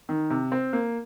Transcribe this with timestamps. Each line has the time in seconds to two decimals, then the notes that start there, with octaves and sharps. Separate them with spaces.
0.09 D#3
0.30 C3
0.52 C4
0.73 A#3